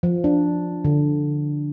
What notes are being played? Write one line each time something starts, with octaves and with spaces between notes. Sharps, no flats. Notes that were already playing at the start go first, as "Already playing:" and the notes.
F3
D4
D3